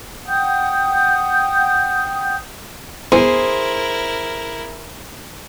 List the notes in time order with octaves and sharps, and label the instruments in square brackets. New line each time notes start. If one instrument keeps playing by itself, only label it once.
[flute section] F#5 G5 D#6 G6
[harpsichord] E2 [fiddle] E4 A#4 [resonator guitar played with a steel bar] G#4 [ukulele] C5